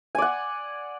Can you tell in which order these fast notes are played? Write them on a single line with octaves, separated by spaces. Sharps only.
G#5 D5 F#5